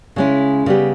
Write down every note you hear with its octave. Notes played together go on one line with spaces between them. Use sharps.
C#3 G#3 C#4 E4
C#3 G3 B3 G4